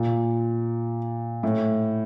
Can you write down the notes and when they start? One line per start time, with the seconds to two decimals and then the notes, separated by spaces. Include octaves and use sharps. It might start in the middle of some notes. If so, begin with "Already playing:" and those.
Already playing: A#2
1.43 A2